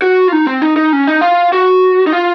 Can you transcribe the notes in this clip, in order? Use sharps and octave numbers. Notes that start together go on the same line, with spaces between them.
F#4
F4
D#4
C4
D#4
D#4
C#4
D#4
F4
F#4
D#4
F4